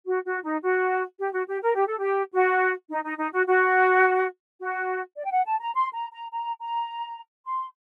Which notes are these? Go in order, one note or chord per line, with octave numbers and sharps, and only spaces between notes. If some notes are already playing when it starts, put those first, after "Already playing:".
F#4
F#4
D#4
F#4
G4
F#4
G4
A#4
G4
A4
G4
F#4
D#4
D#4
D#4
F#4
F#4
F#4
D5
G5
F#5
A5
A#5
C6
A#5
A#5
A#5
A#5
C6